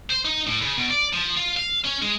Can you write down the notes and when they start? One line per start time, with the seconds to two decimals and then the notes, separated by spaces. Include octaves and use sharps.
0.10 C5
0.25 D#4
0.47 A2
0.62 C#3
0.78 B2
0.91 D5
1.13 F3
1.37 F4
1.57 F5
1.84 C#4
2.02 G#3